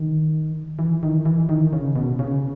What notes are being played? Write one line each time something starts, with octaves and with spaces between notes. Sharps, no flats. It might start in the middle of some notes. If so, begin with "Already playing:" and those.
Already playing: D#3
E3
D#3
E3
D#3
C#3
B2
C#3